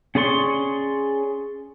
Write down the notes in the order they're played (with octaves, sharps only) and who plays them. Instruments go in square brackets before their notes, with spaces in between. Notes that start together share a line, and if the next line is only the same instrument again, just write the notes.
[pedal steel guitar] C#4 G#4 D5 C6 C#6